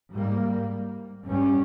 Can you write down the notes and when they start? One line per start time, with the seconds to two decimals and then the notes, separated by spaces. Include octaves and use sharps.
0.14 G#2 G3 A#3
1.27 G2 G3 C#4